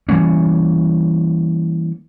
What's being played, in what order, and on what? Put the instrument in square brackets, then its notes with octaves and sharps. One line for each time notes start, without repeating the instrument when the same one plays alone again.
[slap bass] E3 G3 A#3 C#4